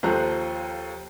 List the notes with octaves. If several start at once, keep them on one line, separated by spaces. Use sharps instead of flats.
D#2 F3 A4 C5 A#5 F#6